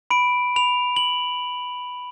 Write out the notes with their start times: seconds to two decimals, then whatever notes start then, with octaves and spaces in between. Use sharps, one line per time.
0.11 B5 D7
0.56 B5 F7
0.96 F#7